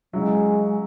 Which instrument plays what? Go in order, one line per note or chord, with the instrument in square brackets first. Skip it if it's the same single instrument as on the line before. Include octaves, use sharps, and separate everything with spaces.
[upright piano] C#3 F#3 E4 [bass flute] G#3